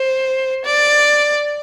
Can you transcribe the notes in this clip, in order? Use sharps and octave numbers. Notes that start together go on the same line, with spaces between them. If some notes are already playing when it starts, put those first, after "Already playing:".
Already playing: C5
D5